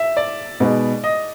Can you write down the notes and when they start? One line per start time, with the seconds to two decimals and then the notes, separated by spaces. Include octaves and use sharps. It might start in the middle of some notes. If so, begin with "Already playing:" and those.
Already playing: E5
0.17 D5
0.60 B2 G#3 B3 D#4
1.04 D#5